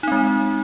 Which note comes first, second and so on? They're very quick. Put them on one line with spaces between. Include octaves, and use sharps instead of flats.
D#4 C4 G#3